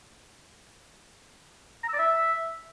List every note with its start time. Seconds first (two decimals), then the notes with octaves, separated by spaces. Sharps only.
1.83 A#5
1.88 E6
1.93 D5
1.99 E5